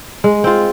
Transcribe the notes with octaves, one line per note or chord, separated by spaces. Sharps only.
G#3
C4 F4